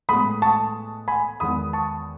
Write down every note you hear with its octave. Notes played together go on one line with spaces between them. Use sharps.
A2 G#3 B3 B5 D#6
A5 C#6
G#5 B5
E2 D#3 G#3 B3 B5 D#6
A5 C#6